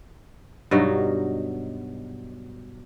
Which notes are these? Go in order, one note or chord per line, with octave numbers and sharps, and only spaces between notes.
G2 B2 F#3 D#4